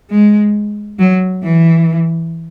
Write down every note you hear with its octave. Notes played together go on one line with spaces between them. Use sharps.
G#3
F#3
E3